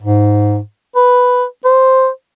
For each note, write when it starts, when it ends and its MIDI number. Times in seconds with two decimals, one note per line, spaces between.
0.02 0.59 44
0.96 1.45 71
1.65 2.08 72